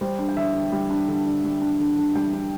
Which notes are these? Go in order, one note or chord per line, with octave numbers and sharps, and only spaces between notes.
G3 C5
D4
G5
D3 E5
D3
G3
D4
D3
D3
G3
D4
D3
D3
G3 G5
D4